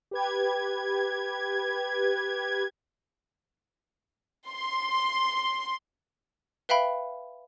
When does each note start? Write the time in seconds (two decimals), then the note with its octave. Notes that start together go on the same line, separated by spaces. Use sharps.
0.11 G4 B4 G#6
4.49 C6
6.69 B4 E5 F5 G5 B5